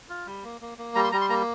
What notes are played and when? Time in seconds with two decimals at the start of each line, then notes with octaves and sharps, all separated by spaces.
0.09 F4
0.26 G3
0.44 A#3
0.61 A#3
0.78 A#3
0.95 G3 A#5
1.04 C6
1.12 G3 A#5
1.21 C6
1.29 A#3 A#5